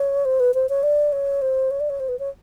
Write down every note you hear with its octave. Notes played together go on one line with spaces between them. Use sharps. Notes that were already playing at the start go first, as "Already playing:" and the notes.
Already playing: C#5
C5
B4
C5
C#5
D5
C#5
C5
C#5
D5
C#5
C5
B4
C#5